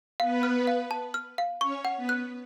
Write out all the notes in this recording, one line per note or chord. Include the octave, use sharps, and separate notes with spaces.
B3 B4 F5
F6
F5
A5
F6
F5
C#4 C#5 C#6
F#5
B3 B4
F#6